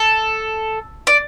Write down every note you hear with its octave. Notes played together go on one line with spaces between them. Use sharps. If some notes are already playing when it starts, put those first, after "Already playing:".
Already playing: A4
D5